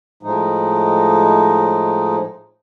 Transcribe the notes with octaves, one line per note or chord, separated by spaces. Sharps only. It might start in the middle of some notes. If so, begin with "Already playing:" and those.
A2 F3 G#3 D#4